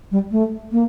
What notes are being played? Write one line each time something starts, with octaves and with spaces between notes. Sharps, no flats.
G3
A3
A#3